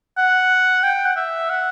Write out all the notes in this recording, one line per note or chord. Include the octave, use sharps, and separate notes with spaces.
F#5
G5
F#5
E5
F#5